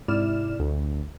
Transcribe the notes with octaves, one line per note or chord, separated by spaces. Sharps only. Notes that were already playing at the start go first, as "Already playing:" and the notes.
G#2 C3 E4 D5 F6 E7
D2